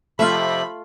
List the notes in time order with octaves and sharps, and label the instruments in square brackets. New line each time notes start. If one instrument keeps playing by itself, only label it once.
[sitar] F2 C3 E5 [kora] A3 F4 [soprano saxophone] B5